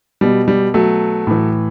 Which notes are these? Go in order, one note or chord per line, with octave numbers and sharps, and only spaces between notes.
B2 G3
G3
F#3 A3
A2 E3